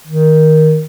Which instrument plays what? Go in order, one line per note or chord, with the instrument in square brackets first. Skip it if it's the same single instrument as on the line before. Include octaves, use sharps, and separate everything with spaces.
[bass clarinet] D#3